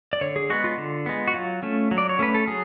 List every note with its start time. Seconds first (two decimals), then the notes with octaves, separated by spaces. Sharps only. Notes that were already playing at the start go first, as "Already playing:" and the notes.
0.13 D5
0.21 D3 C#5
0.36 G#4
0.50 G#3 B3 F#4
0.64 F4
0.78 D3
1.06 G#3 B3
1.28 F#4
1.34 F#3 F4
1.63 A3 C#4
1.91 F#3
1.98 D5
2.09 C#5
2.19 A3 C#4 B4
2.34 A4
2.48 F#3 G#4